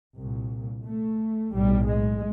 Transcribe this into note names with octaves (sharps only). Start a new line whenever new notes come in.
C2 A#2
A3
B1 A2 G3
G#3